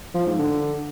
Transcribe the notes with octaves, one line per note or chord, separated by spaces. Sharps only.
F3
G#2
D3